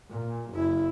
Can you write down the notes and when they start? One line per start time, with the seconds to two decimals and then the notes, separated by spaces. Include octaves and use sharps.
0.11 A#2
0.50 F#1 E4